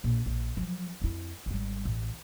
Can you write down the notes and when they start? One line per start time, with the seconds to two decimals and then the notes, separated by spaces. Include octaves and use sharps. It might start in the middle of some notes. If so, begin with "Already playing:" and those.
0.04 A#1
0.26 A#1
0.57 F3 F#3
1.01 F2 E4
1.46 G#1 G3
1.85 A1